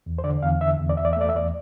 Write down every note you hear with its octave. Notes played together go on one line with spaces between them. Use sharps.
E2
C5
D3 D5
E2 F5
D3 E5
E2
D5
E2 E5
D5
E5
A3 D5
E5
E2 D5